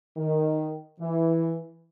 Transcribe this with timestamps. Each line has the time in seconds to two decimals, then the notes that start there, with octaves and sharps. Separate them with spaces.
0.17 D#3
1.00 E3